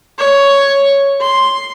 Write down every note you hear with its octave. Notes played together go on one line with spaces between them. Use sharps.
C#5
C6